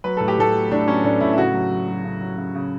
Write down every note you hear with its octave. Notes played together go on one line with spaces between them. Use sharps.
F#3 B4
A2 A4
G4
A2 A4
F#3
A2 D4
F#3 C#4
A2 D4
A2 E4
E4
C#3 F#4
F#3
F#3
F#3
C#3
F#3
C#3
C#3